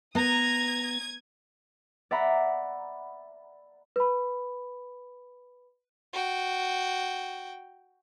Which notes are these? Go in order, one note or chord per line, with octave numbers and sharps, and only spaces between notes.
B3 A#5 D#6 G#6
D5 E5 F#5 A#5 B5
B4 B5
F#4 G5